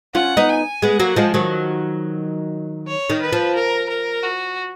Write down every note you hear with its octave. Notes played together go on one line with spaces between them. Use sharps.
C#4 F4 F#5
B3 D#4
G#5
G#3 B3 F#5
F#3 A#3
F3 G#3
D#3 F#3
C#5
D#3
B4
F3
A#4
A#4
F#4